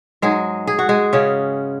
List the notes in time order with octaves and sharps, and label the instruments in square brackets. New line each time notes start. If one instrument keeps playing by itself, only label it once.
[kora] G#2 F#3 G#3 G#4
G#4
F#4
G#3 G#4
C#3 C#4